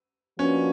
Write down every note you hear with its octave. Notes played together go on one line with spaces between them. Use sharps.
F3 A#3 C#4 D4 F#4 B4